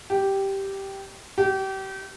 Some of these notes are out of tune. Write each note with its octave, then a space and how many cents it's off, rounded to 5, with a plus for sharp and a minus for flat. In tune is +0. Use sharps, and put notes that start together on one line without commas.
G4 -5
G4 -30